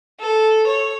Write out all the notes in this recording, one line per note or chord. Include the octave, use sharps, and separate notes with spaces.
A4
C#5